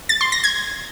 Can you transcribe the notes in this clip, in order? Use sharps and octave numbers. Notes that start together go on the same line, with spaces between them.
A6
C6
A#6
G#6